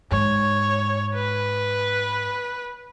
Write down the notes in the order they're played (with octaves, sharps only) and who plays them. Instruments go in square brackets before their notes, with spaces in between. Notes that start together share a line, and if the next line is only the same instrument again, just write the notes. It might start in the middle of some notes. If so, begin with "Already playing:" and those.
[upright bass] G#2 [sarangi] C#5
[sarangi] B4